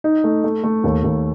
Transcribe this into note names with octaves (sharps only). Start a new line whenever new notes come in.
D#4
A3
A3
A3
D#2
D#2